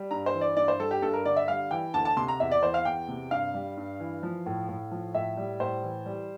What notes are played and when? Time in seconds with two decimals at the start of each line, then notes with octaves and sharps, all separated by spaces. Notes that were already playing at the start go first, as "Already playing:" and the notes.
Already playing: G3
0.11 G2 A#5
0.26 C5
0.34 E3
0.41 D5
0.57 G2 D5
0.68 C5
0.79 G3 A4
0.91 G4
1.02 G2 A4
1.13 A#4
1.25 D3 D5
1.36 E5
1.48 G3 F5
1.71 E3 G5
1.94 D2 A5
2.05 A5
2.17 C3 C6
2.28 A#5
2.40 E2 E5
2.52 D5
2.63 E3 C5
2.74 F5
2.85 E2 G5
3.08 C3
3.31 G2 F5
3.54 G3
3.77 G2
4.00 E3
4.23 F3
4.46 A2
4.69 A2
4.91 F3
5.14 A2 E5
5.37 G3
5.60 A2 C5
5.83 E3
6.06 G3